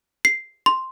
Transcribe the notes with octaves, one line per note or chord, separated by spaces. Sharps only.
C7
C6